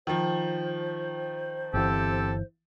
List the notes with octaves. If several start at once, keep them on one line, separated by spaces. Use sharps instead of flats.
D#3 F3 C5
G1 E3 C4 G4 A4